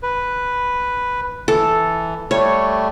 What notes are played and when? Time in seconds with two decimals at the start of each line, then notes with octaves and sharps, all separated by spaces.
0.03 B4
1.48 E3 A4
2.31 G3 A3 C#5